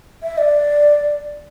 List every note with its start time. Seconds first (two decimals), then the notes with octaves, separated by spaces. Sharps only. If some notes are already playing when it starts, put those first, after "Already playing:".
0.23 E5
0.38 D5